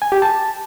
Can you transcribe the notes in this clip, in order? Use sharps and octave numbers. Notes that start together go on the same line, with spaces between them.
G#5
G4
A5